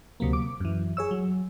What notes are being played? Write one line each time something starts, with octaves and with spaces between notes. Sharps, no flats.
D2 C3 F#3 A#3
D6
F#2 E3
G#4 C#5 E6
F#3